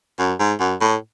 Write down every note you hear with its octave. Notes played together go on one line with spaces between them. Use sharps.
F#2
G#2
F#2
A2